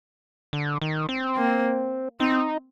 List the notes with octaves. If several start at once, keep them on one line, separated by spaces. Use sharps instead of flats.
D3
D#3
C4
A#3
C4 D#4